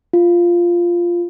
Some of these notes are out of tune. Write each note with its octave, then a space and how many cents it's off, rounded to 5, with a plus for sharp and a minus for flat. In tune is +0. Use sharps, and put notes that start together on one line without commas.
F4 -5